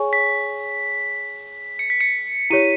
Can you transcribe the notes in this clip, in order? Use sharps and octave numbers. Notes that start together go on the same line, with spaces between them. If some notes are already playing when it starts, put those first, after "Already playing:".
Already playing: G#4 C#5 G#5 C#6
B6
C#7
B6
C#7
E4 G4 C#5 D#7